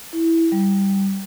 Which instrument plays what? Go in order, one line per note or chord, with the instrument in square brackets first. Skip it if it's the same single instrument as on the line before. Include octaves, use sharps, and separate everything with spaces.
[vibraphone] E4
G3